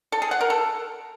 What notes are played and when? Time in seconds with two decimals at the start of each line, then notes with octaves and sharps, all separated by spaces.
0.12 A4
0.22 G#4
0.31 F#5
0.41 A#4
0.50 A4